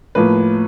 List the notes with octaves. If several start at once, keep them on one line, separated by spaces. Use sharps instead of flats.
A2 F3 A#3 B4